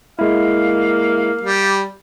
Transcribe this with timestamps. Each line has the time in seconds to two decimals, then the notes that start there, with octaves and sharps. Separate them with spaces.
0.19 G#3 A#3 E4 F5
1.41 G3